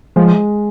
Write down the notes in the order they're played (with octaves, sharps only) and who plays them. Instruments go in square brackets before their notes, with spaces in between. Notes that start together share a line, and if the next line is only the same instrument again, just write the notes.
[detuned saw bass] F3 [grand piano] G#3